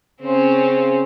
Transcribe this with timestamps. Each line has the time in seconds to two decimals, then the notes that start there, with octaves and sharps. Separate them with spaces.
0.22 C#3 C4 C#4 C5